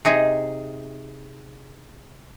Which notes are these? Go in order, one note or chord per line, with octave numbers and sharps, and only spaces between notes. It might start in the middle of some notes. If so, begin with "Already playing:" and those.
C3 D#4 G#4